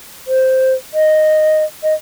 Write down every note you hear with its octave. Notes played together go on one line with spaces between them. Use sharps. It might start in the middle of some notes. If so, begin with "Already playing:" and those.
C5
D#5
D#5